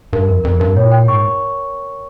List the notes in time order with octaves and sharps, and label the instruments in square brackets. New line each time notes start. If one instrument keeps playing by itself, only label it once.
[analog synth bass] G2 [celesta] A#4
[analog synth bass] F2 [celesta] A#4
[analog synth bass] F2 [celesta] A#4
[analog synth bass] G2 [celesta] A#4
[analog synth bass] A#2 [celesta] C#5
[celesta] G5
[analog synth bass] G#2 [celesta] C#6